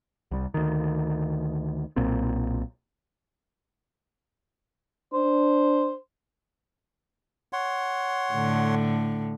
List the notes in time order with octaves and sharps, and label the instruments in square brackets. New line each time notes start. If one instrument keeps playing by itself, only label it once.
[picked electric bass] C2 G3
D2 D#3
B1 A#2 A#3 C4
[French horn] D4 [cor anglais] C5
[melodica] C#5 F#5 C6
[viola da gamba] A2 D3